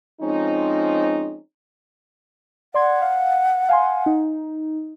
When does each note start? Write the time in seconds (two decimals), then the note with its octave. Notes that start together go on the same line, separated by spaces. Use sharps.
0.21 F3 G#3 C4 C#4 D#4
2.74 D5 F#5 C6 G#6
3.02 F5
3.69 F5 G#5 C6
4.06 D#4